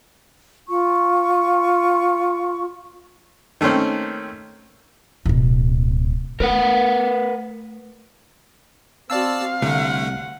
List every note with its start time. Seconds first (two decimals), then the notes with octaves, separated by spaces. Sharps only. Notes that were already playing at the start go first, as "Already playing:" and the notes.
0.68 F4 C#6
3.61 D#3 A3 A#3 C4 C#4
5.26 D1 B2
6.40 A3 A#4 B4 F#5
9.10 C4 F#4 D5 F5 A5 E6
9.62 C2 D3 A3 F#5